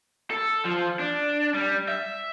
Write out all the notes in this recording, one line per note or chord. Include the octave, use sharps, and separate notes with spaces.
A4
F3
D4
G3
E5